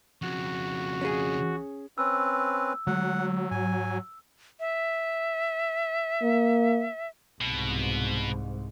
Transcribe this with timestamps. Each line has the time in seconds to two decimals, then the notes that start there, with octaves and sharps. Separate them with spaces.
0.22 F2 C#3 F#4
1.02 C#4 G#4
1.98 C4 C#4 B4 E6
2.87 D3 F#3 G#3 A3 F#5
3.51 G#2 G#5
4.60 E5
6.23 A#3
7.41 C2 G#2 B2